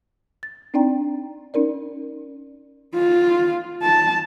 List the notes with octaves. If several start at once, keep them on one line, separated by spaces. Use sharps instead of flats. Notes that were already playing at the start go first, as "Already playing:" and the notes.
A6
C4 D4 D#4 D5 G5 A#5
C#4 D#4 A#4 D5
F4
A5